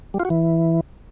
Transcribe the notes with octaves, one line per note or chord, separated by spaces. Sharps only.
G3
F4
F#4
E3